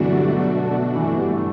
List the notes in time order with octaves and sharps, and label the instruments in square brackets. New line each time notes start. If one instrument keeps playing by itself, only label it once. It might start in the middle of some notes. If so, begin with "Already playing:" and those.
Already playing: [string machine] B2 A3 D4 F#4 [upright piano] D3 E3 F#3
[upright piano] G3
F#3
E3
G3
A3